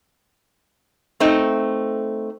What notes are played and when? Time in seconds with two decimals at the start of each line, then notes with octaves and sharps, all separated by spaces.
1.20 A3 C4 D#4